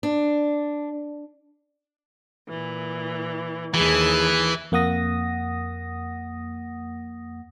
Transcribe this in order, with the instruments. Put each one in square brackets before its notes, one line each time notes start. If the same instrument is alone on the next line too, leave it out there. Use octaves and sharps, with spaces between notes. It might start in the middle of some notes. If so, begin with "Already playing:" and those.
[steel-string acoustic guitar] D4
[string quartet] A#2 E3
[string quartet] D#2 G#4 A5 [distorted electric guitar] E3
[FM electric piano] F2 A#3 F#5 D#6 A#6